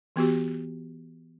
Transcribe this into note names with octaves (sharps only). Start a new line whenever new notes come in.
E3 B3 F#4 G4